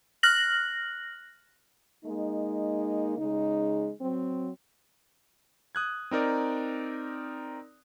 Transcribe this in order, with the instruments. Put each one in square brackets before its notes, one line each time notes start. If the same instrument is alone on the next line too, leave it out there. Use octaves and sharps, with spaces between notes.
[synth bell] F6 F#6 A#6 F#7
[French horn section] G#3 A#3 D#4
C#3 G#3 D#4
F#3 C4
[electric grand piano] D#6 F#6 G#6
C4 D#4 A#4 D5